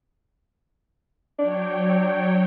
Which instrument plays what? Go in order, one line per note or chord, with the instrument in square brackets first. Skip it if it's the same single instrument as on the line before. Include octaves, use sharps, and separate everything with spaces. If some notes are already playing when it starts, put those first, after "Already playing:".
[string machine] F#3 C#5 G5 [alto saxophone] D4